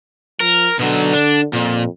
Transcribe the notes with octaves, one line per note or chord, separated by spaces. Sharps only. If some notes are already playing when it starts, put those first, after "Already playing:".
F3 A#4
B2 D3 F#3
D4
F2 A#2